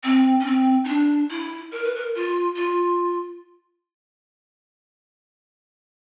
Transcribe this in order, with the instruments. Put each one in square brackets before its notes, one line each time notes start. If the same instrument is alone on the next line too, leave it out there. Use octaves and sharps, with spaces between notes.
[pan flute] C4
C#4
C4
D#4
D4
E4
A#4
B4
A#4
F4
F4